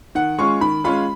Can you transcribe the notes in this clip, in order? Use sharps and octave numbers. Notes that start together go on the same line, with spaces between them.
D#3 F#5
G#3 C#4 F4 C#6
D#3 B5
G#3 C#4 F4 B5